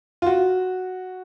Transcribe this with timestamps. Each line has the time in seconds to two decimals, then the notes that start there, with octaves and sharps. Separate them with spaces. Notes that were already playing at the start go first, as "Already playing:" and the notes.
0.22 F4
0.26 F#4